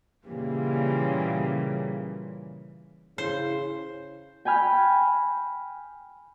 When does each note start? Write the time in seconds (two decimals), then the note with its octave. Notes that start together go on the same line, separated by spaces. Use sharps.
0.27 A#2 C#3 E3 G3 A#3
3.18 C#3 E4 C5
4.45 G5 G#5 B5 F6